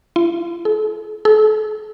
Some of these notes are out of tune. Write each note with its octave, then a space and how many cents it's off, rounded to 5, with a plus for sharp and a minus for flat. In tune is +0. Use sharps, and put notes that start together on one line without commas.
F4 -45
A4 -40
A4 -40